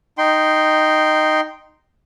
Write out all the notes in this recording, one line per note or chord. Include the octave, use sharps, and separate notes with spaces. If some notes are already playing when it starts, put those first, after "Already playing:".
D#4 G5 C6